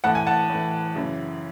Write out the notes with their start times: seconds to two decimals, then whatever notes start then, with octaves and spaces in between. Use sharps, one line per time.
0.04 A2 E3 F#5 A5
0.15 G#5
0.27 F#5 A5
0.50 A2 E3
0.96 F#2 C#3 E3